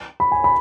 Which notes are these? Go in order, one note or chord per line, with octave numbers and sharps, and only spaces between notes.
B5
G#5
B5